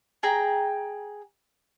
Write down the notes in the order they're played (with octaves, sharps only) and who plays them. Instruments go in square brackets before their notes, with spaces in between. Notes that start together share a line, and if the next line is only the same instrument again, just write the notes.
[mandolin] G#4 G5 A#5